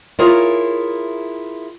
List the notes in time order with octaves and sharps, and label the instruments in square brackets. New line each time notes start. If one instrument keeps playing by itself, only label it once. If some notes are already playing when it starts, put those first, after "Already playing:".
[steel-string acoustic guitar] E4 F4 G#4 A#4 C#5